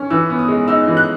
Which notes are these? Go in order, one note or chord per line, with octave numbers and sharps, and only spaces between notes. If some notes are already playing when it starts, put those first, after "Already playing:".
Already playing: C#4
E3 E6
B3
D#6
G#3
D#4 E6
E3
F#6